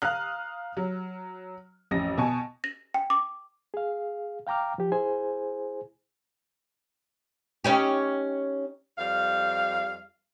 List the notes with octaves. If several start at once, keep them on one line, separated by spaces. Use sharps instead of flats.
F5 A#5 D#6 F6 F#6
F#3
A1 F2 C#4 A#6
B2 G#5 A5 C#6
A#6
G5
D6
G#4 F5
F5 G5 A#5 D6 F6
F3 G4
E4 G#4 C5 G#5
C#4 D#4 G4
F2 G3 F5